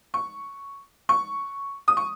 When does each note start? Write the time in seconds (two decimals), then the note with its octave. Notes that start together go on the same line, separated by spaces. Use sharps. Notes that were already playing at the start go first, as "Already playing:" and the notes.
0.14 C#6
1.09 C#6
1.88 D#6
1.97 C#6